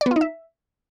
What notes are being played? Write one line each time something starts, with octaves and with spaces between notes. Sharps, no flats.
D5
B3
F4
D#4
E5